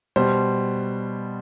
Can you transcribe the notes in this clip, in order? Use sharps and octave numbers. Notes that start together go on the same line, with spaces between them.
B2 G3 C5